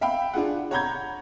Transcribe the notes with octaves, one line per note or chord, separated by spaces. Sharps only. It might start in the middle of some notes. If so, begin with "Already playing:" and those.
E5 F5 G5 B5
D4 F4 G#4 F#5
C#5 F#5 A#5 B5 G6 G#6